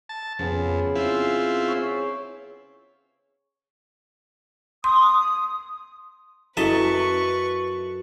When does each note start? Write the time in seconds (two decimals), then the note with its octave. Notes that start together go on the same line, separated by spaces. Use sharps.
0.09 A5
0.39 F2 C#3 B3
0.95 C4 E4 F4
1.68 C#5
4.84 C6 D#6
6.57 F#2 E4 A4 B4 D#5 E5 C#6